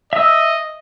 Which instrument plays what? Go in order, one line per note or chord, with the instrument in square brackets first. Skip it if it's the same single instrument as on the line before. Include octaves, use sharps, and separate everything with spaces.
[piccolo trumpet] D#5 [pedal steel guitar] E5 E6